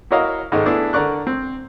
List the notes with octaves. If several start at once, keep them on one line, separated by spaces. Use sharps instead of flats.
E4 F#4 A#4 C#5 D#5 F5
G#2 D#3 G#3 A3 D#4
A3 B3 D4 E4 G#4
D3 A#4 D5 C#6 F#6
C4